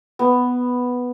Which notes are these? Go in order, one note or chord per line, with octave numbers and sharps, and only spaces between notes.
B3